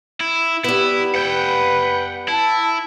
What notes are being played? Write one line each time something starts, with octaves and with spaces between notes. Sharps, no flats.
E4
G3 B3 E4
B4 F#5 G5
E4 A5